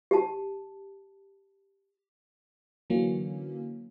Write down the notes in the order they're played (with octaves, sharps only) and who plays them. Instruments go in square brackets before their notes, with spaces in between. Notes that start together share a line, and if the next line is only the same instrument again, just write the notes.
[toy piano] G4 A5
[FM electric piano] D3 E3 F#3 A#3 C#4